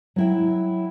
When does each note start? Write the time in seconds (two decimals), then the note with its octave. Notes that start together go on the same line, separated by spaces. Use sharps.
0.16 F#3 E4 G5